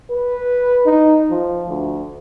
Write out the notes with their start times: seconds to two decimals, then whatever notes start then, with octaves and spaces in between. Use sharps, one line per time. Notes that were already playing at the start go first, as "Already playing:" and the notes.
0.10 B4
0.86 D#4
1.31 F3
1.69 D2